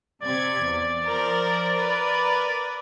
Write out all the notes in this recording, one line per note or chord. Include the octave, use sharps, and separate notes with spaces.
C3 D5 G#6
E2
F3 A#4 C5
A#4 B4